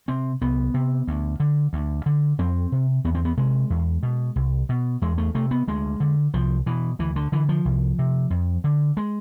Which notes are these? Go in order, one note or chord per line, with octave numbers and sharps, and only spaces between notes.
C3 C4
C2 B3
C3
D2
D3
D2
D3
F2 C4
C3
E2 B3
C4
B3
C3 G#3
E2
B2
C2
B2
E2 G#3
A3
C3 A3
B3
D2 G#3
D3
C2 F3
B2 E3
D2 E3
D3
D3 E3
F3
C2
C3
F2
D3
G#3